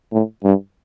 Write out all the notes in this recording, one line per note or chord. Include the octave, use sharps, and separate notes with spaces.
A2
G2